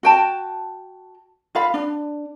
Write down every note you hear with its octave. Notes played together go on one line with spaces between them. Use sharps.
F#4 G5 A5
F4 F5 B5
D4